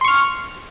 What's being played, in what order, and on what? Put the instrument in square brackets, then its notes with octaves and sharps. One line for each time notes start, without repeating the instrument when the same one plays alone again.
[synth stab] C6
C#6
F6